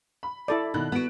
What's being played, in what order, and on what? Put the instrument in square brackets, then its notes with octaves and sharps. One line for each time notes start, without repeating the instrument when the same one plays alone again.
[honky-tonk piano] B5
[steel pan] E4 A4 D5
[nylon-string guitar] B2 [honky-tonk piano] D#3 B5 F#6
[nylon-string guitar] B3 F#4 [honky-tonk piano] F#6 D7